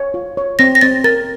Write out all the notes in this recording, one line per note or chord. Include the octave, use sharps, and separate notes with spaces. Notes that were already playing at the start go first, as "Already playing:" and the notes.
Already playing: C#5
F4
C#5
C4 A#6
A#6
C4 A6
A#4 A6